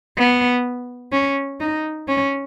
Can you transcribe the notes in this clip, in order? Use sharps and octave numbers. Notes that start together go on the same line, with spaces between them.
B3
C#4
D#4
C#4